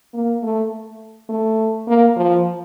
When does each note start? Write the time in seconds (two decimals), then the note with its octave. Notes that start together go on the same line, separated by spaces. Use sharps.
0.14 A#3
0.43 A3
1.29 A3
1.88 A#3
2.16 F3